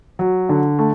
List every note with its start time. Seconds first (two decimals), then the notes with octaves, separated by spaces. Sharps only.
0.19 F#3
0.49 D3
0.79 A3